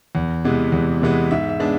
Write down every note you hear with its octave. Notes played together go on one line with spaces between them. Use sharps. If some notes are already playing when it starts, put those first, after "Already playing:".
E2
C3 E3 G#3 B3
E2
C3 E3 G#3 B3
G#2 E5
E5
G#3 B3 D4